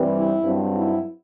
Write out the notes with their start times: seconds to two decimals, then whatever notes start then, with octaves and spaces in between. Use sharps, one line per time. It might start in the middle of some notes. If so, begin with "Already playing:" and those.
Already playing: G2 E3 G3 C4
0.14 E4
0.44 G2 F#3 C4
0.75 E4